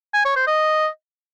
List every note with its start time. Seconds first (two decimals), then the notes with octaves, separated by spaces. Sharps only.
0.14 G#5
0.25 C#5
0.36 C5
0.47 D#5